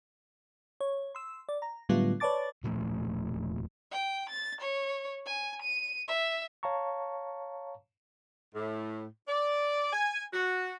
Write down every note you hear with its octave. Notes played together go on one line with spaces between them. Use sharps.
C#5
C6 E6
D5
A#5
A2 D3 F#3 G3 B3 F4
B4 C#5 D5 A5 D6 A6
E1 A#2 F3 A3
G5
A6
C#5
G#5
D#7
E5
C#5 F5 A5 A#5 C#6
A2
D5
G#5
F#4